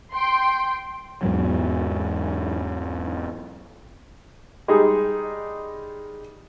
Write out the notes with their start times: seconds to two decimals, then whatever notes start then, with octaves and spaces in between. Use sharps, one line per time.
0.12 G5 C6
1.23 E2 G#2 F#3
4.68 G3 G#3 D#4 G#4